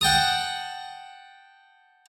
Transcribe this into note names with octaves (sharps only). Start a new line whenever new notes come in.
F#5 G5 A5 D#6